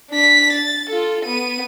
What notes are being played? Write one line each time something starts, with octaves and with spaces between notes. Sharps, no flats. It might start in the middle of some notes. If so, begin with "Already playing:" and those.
D4 B6
A6
F4 A4
B3 D#7